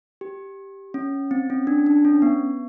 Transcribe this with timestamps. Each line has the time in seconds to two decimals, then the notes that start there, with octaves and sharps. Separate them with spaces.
0.21 G4
0.94 C#4
1.31 C4
1.50 C#4
1.67 D4
1.86 D4
2.05 C#4
2.22 B3